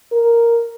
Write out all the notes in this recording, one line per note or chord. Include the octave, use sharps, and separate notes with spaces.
A#4